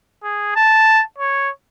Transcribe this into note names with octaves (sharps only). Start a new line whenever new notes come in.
G#4
A5
C#5